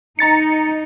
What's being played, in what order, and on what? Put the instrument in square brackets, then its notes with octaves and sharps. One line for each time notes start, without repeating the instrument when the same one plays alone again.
[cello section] D#4 [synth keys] A#5 A6 C#7